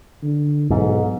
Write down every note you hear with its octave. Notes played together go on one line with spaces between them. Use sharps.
D3
B1 G#2